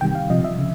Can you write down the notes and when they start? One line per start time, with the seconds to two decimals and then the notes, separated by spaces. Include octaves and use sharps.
0.01 C3 D#3 G3 G5
0.15 F5
0.30 C3 F3 D#5
0.44 E5
0.59 C#3